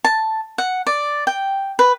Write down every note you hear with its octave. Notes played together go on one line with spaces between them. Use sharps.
A5
F#5
D5
G5
B4